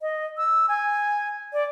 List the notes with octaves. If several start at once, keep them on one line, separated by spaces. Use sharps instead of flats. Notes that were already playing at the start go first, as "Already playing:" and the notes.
D#5
E6
G#5
D5